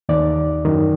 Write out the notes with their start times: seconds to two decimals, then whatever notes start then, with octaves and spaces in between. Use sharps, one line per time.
0.09 D#2 D#3 D5
0.65 F#2 D#3